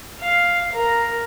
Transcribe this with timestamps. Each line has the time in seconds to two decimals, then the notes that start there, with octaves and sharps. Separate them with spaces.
0.20 F5
0.72 A#4